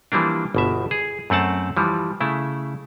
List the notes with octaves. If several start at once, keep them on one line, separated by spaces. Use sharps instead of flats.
E3 F3 G3 A#3 D4
G1 B2 E5
G#4
F#2 A3 C4 F#5 A5
E3 F3 G3
C#3 A3 E4